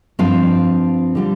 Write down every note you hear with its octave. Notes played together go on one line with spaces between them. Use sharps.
G2 F3 C4 F4 F5
D3 G3 F4